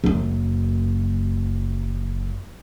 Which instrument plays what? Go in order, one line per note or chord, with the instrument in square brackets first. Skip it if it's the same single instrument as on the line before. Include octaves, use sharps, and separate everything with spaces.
[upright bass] F#1 F#2